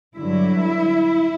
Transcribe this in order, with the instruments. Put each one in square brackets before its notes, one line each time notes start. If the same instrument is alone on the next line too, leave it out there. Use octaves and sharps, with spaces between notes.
[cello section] G2 D3 F#3 E4